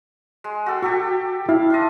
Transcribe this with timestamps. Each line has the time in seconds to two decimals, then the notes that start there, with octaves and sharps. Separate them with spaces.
0.44 G#3
0.66 F#4 A4 G5
0.83 F#4 G4 A4 C#6
1.49 E4 F5
1.70 D4 F4 D#5